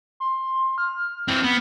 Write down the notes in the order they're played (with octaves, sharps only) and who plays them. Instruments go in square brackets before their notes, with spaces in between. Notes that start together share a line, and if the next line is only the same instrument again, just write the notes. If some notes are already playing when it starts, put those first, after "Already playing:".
[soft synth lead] C6
F6
[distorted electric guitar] E3 C4
B3